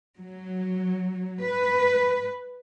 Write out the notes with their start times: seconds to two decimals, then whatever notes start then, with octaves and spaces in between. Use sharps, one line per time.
0.19 F#3
1.43 B4